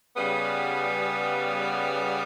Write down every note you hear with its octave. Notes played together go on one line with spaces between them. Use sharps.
C#3 G3 B3